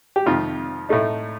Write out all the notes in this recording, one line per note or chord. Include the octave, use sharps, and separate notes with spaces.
G4
F2 C3 D#3 F4
A2 A3 D#4